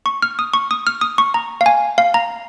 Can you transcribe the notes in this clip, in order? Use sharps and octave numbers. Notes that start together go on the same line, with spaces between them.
C#6
F6
D#6
C#6
D#6
F6
D#6
C#6
A#5
F5
G#5
F5
A#5